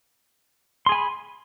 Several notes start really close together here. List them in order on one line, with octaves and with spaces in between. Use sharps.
C6 G#4 G#5 B5